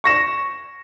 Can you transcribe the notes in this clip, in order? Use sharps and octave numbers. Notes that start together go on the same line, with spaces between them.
C#6 A#6 E7